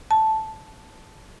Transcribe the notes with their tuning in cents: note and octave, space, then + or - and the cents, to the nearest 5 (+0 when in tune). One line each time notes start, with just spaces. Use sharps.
A5 -5